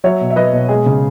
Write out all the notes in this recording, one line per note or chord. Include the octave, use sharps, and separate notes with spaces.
F#3 C#5 E5
B2
E5
F#3 B4 D#5
B2
G#3 G#4
C#3